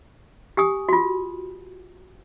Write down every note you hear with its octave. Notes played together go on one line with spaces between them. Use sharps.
G4 G#5 D#6
F4 F#4